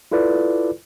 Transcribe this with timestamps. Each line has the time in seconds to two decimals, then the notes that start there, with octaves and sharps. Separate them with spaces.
0.12 E4 F4 A4 B4 D5